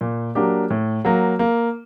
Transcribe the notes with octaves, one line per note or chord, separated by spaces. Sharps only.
A#2
F#3 A#3 D4 G4
A2
F#3 A#3
A#3